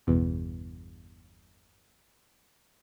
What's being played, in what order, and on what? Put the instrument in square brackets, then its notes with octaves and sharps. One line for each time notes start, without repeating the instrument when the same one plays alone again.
[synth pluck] G1 E2 B2